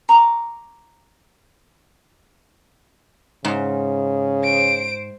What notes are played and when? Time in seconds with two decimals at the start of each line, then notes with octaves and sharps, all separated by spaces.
0.09 A#5 C#6 D6
3.45 G#2 C#3
4.42 C5 D7